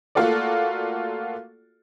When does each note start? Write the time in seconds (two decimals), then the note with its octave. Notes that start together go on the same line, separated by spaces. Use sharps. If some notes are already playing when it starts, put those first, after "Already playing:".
0.15 A3 A#3 F4 F#4 A4 D5